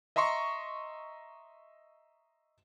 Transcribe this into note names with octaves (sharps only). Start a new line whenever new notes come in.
D#5 E5 A#5 C6 C#6